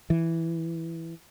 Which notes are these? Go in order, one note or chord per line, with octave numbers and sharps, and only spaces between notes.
E3